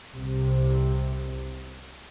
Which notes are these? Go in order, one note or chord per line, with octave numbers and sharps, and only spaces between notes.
C2 C3